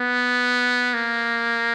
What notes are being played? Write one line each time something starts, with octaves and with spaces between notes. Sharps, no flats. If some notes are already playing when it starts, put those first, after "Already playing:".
Already playing: B3
A#3